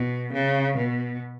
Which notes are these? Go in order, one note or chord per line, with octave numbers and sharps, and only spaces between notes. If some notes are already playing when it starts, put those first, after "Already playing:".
Already playing: B2
C#3
B2